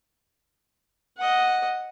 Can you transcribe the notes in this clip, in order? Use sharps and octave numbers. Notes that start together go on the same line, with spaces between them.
D#5 F#5